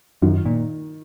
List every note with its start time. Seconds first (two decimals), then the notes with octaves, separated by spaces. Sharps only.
0.22 F#2 D#3
0.45 A#2